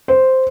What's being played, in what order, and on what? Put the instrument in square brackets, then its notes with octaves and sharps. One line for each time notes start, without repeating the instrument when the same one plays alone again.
[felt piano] C5